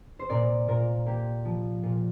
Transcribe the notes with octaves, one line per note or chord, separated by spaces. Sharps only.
C5
A#2 A#4 D5
A#2 F4 A#4
A#3 G4
F3
A#2 F4